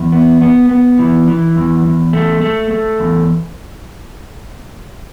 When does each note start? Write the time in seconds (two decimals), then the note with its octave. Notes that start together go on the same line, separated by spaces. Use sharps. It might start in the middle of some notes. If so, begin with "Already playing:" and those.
Already playing: E2
0.12 B3
0.41 B3
0.69 B3
0.99 E3
1.28 E3
1.56 E2
1.84 E2
2.13 A3
2.41 A3
2.71 A3
3.00 E2